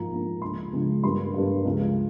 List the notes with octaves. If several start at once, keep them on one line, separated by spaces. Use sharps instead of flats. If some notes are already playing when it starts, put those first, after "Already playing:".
Already playing: G#2 F3 A#3 A#5
G#2 F3 A#3
C#2 C#3 F3 G#3 C6
C#2 C#3 F3 G#3
G2 G3 A#3 C6
G2 G3 A#3
C#2 C#3 F3 G#3